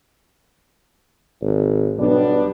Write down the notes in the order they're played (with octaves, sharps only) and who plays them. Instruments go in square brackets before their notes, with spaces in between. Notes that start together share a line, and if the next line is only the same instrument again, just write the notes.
[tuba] G#1
[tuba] B1 [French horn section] G3 B3 D4